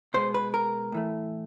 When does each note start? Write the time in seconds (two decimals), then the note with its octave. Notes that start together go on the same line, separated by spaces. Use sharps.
0.14 B2 G#3 B3 C5
0.34 B4
0.54 A#4
0.92 A2 E3 A3